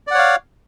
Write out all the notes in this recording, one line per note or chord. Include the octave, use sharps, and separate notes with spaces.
C#5 D5 F5 F#5